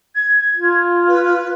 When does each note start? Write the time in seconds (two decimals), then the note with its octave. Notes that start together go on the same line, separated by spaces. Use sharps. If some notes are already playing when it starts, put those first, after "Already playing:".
0.15 G#6
0.56 F4
1.08 B4